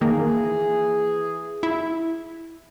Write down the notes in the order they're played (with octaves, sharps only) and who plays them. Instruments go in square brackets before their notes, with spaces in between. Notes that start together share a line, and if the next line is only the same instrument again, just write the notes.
[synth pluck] D#3 A#3 [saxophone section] E3 G#4
[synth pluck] E4